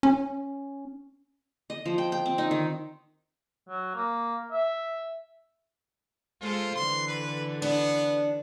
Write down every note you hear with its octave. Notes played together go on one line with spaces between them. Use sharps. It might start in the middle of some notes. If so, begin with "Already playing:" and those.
C#4
D#5
F3
G5
G5
C4
D#4
D#3
F#3
A#3
E5
G#3 F4 A4 C5
D3 E3 C6
B4
B3 D4